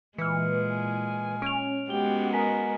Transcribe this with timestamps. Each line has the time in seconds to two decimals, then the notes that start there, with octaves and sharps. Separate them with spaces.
0.18 A#2 E3 G#3 F6 C#7
0.73 G#5
1.42 C#4 D7 F7
1.90 G#3 B3 F#4 G4 G7
2.33 A#4 D#5 G#5 B6